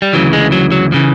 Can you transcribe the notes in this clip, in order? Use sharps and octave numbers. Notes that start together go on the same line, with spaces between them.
G3
D2 C#3 E3 F#3
G#3
F#3
F#3
C#3 E3 F3